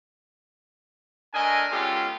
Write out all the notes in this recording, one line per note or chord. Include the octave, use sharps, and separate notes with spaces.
A3 D4 A#4 D#5 G#5
G#3 B3 C#4 F4 G4 A4